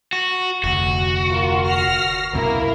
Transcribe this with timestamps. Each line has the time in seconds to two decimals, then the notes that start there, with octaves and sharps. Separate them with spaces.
0.13 F#4
0.64 F1 D2 F#4
1.30 F4 A#4
1.67 F6 A#6 C7
2.33 C#2 F#2 B2 A#3 E4 A#4